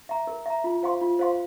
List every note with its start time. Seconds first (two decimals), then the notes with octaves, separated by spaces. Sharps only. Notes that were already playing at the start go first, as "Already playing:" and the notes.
0.09 E5 A#5
0.27 A#4
0.46 E5 A#5
0.64 F4
0.83 C5 F5 C6
1.01 F4
1.19 C5 F5 C6